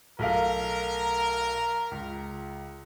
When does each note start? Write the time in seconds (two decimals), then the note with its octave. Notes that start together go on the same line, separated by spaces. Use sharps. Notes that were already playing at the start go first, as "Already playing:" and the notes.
0.19 B1 A3 A#4 F5
1.91 C#2